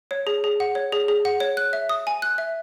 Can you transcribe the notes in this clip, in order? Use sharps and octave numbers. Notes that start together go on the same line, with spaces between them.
C#5
G#4
G#4
F#5
C#5
G#4
G#4
F#5
C#5
F#6
E5
D#6
G#5
F#6
E5